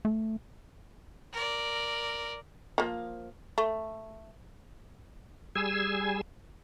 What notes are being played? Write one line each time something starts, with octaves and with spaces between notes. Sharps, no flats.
A3
A#4 D5
F3 A#3
A3
G3 G#4 G#5 E6